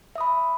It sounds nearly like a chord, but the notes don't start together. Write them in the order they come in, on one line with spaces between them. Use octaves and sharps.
E5 D#6 B5